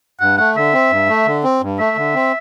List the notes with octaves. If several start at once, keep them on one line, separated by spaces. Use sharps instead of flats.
G2 F#5
A3 F#5
D3 E5
C4
G2
A3
D3
C4
G2
A3 E5
D3
C4